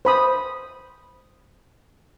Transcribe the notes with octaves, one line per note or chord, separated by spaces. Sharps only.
C5 B5 D#6